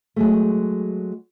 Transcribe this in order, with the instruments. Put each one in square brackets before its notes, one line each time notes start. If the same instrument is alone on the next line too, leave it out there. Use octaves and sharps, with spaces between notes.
[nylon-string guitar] F#3 G#3 A3